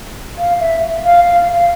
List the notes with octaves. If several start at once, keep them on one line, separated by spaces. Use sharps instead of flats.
F5
E5
F5
F5
F5